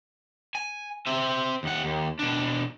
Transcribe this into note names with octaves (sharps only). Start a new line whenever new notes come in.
G#5
C4 E5
D#2 F#5
D#2
B2 D4